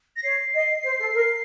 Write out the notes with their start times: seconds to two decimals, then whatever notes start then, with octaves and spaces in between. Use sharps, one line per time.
0.16 A#6
0.23 C#5 C7
0.54 D#5
0.85 C5
0.99 A4
1.14 A#4